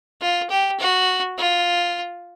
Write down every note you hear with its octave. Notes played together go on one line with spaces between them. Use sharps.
F4
G4
F#4
F4